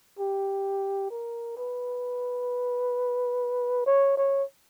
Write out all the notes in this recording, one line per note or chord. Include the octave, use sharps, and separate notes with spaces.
G4
A#4
B4
C#5
C#5